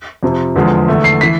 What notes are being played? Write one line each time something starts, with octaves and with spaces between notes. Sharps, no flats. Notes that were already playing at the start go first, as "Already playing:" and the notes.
F2 C3 F3
E2 D3 F3 G#3
E2 D3 A3
C7
E3 B6